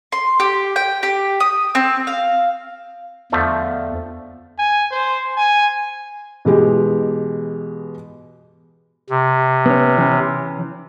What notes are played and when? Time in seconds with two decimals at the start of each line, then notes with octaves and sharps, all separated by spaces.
0.12 C6
0.40 G4
0.76 G5
1.03 G4
1.40 D#6
1.75 C4
2.07 F5
3.32 E2 D3 F3 A3
4.58 G#5
4.91 C5
5.36 G#5
6.45 B2 E3 G#3 G4
9.10 C3
9.66 B3 C#4
9.98 E3 C#4